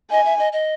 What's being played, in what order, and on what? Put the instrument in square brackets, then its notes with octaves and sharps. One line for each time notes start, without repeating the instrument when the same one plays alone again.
[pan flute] D#5 [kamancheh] G#5
[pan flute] E5
D#5
D#5